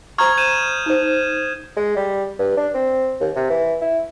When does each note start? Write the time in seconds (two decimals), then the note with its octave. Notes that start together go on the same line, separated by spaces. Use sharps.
0.18 C5 A#5 C#6 D#6 F6 G#6
0.37 G6 D#7 E7
0.86 D#4 C5
1.76 G#3
1.96 G3
2.39 G2
2.57 D4
2.74 C4
3.20 D#2
3.36 C3
3.50 E3
3.81 E4